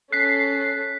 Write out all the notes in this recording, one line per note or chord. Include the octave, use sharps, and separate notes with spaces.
C#4 A4 F#6 B6 C7